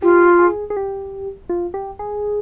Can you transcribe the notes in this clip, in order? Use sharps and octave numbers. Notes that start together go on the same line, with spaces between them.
F4 G4
G#4
G#4
G4
F4
G4
G#4